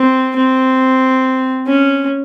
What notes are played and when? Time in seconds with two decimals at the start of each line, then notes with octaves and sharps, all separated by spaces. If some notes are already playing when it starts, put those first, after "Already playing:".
Already playing: C4
0.35 C4
1.67 C#4